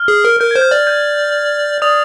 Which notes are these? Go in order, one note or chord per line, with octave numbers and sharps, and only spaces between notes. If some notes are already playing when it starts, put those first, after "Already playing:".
Already playing: F6
G#4
A#4
A#4 G6
C5 G#6
G6
D5
G6
D5 D#6